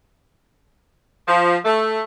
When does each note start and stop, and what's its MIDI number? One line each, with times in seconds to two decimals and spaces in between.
1.27 1.56 53
1.64 2.00 57